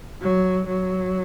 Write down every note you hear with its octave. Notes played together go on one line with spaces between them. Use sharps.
F#3
F#3